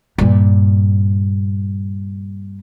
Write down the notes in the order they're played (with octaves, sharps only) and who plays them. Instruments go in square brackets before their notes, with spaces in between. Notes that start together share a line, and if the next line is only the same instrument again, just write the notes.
[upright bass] G2 A#2